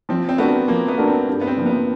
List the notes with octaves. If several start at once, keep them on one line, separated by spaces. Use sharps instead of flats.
F3 C4
C4
A3 B3 D4 F#4 A#4
F3 A#3
B3
A3 D4 F#4 A#4
C4
G2
B3
C4
D3 F3 A#3
B3